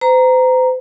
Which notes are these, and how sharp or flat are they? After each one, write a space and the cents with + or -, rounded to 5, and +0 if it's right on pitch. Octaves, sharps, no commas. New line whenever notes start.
C5 -40 A#5 +0